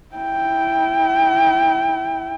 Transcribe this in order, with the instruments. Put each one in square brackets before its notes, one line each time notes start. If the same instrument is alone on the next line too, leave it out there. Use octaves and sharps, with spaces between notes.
[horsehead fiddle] E4 G5